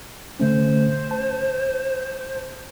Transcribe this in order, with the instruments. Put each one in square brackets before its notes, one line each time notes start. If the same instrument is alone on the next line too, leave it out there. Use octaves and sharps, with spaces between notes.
[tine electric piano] D3 A3 C#4 [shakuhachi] C5
[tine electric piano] A5